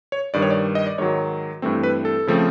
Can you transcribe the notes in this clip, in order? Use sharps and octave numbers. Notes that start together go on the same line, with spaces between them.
C#5
G2 D#3 G3 D5
C#5
D5
D#5
D5
G#2 D#3 F#3 C#5
G2 E3 A3 C4
B4
A4
C#3 F3 A3 C4